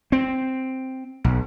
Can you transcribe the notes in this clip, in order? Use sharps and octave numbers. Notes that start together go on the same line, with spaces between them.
C4
B1